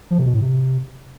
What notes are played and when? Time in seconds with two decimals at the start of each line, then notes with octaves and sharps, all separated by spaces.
0.11 F3
0.18 C3
0.26 B2
0.34 A2
0.41 C3